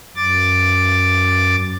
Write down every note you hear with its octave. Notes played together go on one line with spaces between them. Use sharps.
F#2 D6 A6